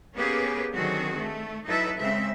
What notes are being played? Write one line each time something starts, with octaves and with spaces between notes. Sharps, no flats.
A#3 B3 C#4 G4 G#4 B4
D3 D#3 F#3 C4 F#4 G#4
A3
F#3 D#4 E4 A4 B4 E5
C#3 G#3 C4 E5